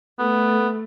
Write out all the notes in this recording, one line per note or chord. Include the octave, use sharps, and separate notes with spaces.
A3 B3